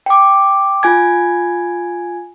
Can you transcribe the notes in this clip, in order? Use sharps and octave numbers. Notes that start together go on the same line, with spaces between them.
G5 D6
F4 G#5 G#6